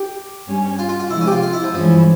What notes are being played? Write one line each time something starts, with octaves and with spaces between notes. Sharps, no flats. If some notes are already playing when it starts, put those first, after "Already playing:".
Already playing: G4
G2 G3 C#4
F4
F4
F4
C3 F3 G#3 E4
C#4
G4
F4
F4
E4
F3
G2 E3 F3 G#3 C#4 E4